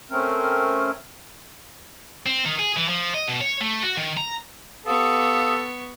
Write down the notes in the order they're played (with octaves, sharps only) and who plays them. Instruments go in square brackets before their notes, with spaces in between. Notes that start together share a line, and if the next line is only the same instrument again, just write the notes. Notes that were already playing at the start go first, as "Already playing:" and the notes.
[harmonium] A3 C4 C#4 A#4
[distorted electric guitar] C4
D#3
G#4
E3
F3
D#5
B2
C#5
A3
F#4
D#3
A#5
[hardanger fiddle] B3 C#6 [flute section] G4 F5 D#6 [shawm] A4